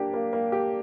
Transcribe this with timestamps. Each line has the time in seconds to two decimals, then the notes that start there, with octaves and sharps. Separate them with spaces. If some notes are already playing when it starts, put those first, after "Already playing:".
Already playing: A#3 D4 G4
0.14 A#3
0.33 A#3
0.52 G4